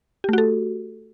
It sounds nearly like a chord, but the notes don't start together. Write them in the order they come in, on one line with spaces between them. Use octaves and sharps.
G4 A3 F#4 A4